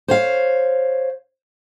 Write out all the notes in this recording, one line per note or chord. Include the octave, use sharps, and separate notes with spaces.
C5 C#5 F5